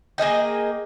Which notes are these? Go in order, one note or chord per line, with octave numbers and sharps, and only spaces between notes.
A#3 G#4 D#5 G5